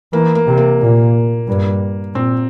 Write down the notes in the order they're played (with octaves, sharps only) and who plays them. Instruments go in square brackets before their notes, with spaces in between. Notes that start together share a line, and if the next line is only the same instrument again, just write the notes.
[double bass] E3 [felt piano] A#3
[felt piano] A#3
[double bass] C3
[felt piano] A#3
[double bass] A#2
G2
[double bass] A#2 [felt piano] C4